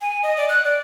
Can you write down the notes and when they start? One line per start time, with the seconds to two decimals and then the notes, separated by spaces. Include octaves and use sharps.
0.01 G#5
0.23 D#5
0.37 D5
0.49 F#6
0.65 D5